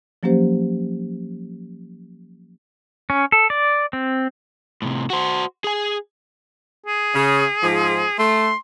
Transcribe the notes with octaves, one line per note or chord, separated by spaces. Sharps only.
F3 F#3 A#3 C#4 G4 C5
C#4
A4
D5
C4
A2 C3
F#4 C5
G#4 G#5
G#4
C#3
G#2 F3
A3 C6